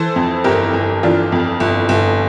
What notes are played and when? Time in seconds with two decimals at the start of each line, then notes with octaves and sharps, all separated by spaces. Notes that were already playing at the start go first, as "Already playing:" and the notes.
Already playing: E3 A4 C5
0.16 F2
0.44 G1 G4 A#4
0.73 G1
1.03 E3 D4 F4
1.32 F2
1.60 G1
1.89 G1